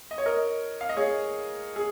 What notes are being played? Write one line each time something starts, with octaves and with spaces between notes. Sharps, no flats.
D#5
C#5
A#4 D#5
F5
D#5
G#4 C#5
G#4